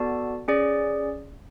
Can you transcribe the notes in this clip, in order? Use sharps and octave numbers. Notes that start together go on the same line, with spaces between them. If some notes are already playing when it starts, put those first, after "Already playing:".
Already playing: B3 F#4 A4 D5 A5
C#4 G#4 D5